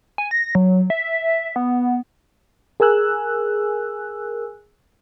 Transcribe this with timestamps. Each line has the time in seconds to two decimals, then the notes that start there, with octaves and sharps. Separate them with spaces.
0.18 G#5
0.31 A#6
0.55 F#3
0.90 E5
1.56 B3
2.80 G#4 A#4 G#5 E6 F#6